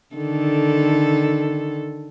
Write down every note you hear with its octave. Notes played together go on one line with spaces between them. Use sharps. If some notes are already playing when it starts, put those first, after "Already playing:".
D3 D#3 A4